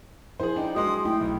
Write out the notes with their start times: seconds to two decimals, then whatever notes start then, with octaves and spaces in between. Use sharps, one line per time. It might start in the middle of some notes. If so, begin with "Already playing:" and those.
0.40 F3 E4 G#4 C5
0.56 D4 D#4 G5
0.75 F#3 G#3 C6 D#6
1.05 A3 E4 G5
1.21 B1